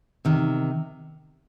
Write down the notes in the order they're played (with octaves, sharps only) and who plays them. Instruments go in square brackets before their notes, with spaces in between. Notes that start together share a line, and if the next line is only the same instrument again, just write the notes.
[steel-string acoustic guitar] C3 D#3